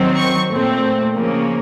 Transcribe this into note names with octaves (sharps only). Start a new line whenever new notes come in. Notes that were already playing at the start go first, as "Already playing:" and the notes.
Already playing: D#3 F#3 C4
C#6
A#2 A3 C4
C#3 F3 A#3